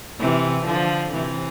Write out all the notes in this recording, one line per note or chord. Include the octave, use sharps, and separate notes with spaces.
C3 E3
D3 F3
C3 E3